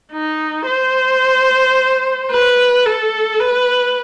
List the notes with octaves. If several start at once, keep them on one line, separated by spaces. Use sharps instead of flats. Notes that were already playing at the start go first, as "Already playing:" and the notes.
D#4
C5
B4
A4
B4